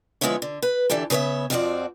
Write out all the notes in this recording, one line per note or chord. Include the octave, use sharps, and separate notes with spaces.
D3 F3 G#3 B3 E4 C#5
D3
B4
D3 E3 D4 G4 A4
C#3 B3 A#4 C#5 E5
F2 F3 C4 D4 F#4 D5